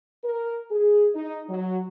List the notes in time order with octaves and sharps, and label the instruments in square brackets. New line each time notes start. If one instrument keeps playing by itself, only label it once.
[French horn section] A#4
G#4
D#4
F#3